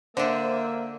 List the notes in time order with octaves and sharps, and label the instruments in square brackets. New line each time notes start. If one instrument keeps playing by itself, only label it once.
[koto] D3 D4 [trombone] A#3 [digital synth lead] C5 [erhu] E5